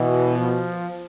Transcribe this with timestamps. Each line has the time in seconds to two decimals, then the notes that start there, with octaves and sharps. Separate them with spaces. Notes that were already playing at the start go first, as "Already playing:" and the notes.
Already playing: B2 E3
0.39 F3